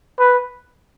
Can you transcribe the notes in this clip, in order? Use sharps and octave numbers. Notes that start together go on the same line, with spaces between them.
B4